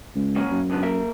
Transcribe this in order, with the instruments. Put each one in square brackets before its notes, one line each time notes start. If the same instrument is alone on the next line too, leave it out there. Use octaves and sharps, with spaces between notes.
[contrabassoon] C#2
[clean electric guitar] F#3 A#3 C#4
[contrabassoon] F#2
[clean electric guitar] C#2 D3 B3
A#3 A#4 E5